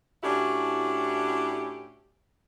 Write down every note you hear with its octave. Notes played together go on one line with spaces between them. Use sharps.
A2 C#4 D4 E4 F#4 G4